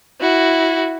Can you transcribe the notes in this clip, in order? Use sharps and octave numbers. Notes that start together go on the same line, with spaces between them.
E4 F#4